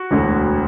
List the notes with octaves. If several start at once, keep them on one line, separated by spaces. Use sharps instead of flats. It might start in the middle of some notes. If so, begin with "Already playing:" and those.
Already playing: F#4
E1 D2 D3